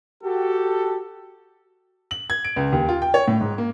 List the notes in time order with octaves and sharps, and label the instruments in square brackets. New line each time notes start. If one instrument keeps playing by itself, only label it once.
[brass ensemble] F#4 G4 A4
[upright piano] F#7
G#6
D7
C#2
D#2
F4
G5
C#5
A2
G#2
A#3